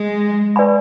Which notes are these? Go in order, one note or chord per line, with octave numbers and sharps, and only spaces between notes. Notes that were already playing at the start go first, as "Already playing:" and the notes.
Already playing: G#3
B4 D5 G#5 B5